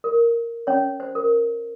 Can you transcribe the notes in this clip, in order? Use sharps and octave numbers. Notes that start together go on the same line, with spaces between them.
A#4
C#4 C#5
C5
A#4